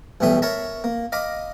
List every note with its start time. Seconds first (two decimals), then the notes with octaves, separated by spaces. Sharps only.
0.20 B1 A2 E3 G3 E5 D#6
0.42 A#4 C#5 E5 A5 B5
0.84 A#3
1.12 D#5 F5 A#5 B5 D6